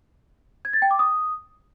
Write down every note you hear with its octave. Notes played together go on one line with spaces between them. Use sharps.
G#6
A6
G5
D6
D#6